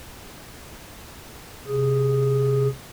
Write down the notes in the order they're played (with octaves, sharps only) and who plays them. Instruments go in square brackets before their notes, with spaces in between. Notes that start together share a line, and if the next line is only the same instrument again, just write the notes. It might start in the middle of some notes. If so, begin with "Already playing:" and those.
[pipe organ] C3 G#4